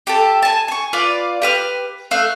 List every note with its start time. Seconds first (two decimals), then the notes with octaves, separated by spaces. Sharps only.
0.07 G4 A4 A5
0.43 G#5 A5
0.68 G#5 C#6
0.93 F4 B4 D5 F5
1.42 G4 B4 F6
2.11 A3 E5 F5 F#6